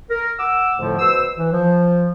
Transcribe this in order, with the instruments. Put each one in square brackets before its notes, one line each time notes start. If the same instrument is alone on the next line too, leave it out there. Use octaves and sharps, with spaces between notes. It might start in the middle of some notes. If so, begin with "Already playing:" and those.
[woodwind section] A#4
F#5 D6 E6
F2 A2 D3 F3 A3
B2 C5 E6
E3
F3